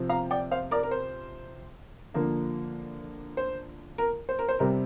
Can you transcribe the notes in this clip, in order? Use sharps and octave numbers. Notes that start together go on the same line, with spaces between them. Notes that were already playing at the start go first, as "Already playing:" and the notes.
Already playing: C3 F3 C4
F5 A#5
D5 G5
C5 F5
A#4 D5
A#4
C5
D3 F3 A#3
C5
A#4
C5
A#4
C5
C3 G3 C4 A#4